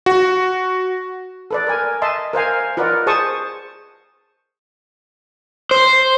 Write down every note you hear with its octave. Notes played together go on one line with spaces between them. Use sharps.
F#4
A4 B4 D5
A#4 G#5
D#5 E5 A5 C6
A#4 C5 F5 G#5
F4 A#4 B4 D5 D#5 F#5
G#4 C5 A5 C#6 D#6
C5